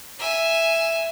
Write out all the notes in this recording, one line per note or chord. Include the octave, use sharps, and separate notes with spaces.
E5 G#5